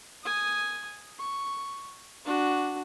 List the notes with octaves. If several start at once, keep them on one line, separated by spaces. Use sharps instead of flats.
G#5 D#6
C#6
D4 F#4